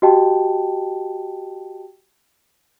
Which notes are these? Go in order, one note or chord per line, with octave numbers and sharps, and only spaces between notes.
F#4 G4 D#5 G5 A5